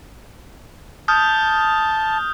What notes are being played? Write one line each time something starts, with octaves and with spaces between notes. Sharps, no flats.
A5 D#6 F6 G6